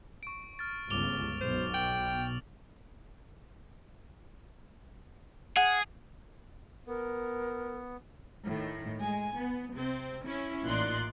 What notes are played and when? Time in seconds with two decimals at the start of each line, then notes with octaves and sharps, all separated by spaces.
0.23 C#6 D7
0.59 F6 A6
0.90 G1 C#2 D6 F7 G7
1.41 B1 B2 C5
1.74 G5 F#7
5.56 G#4 F#5
6.87 B3 A#4
8.44 A2 D#3
9.01 G#3 G#5
9.37 B3
9.74 C3 C4
10.23 C#4 E4
10.65 A1 A#2 D#4 D5 C6 F#6